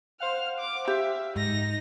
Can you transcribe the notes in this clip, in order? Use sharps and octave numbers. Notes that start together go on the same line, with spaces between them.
C5 F5 F#5 F6
D6
G4 E5
G#2 D#4 A#6